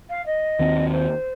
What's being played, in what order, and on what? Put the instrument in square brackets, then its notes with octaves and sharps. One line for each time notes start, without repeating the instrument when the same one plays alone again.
[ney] F5
D#5
[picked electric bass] D#2 D#3 C4
[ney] C5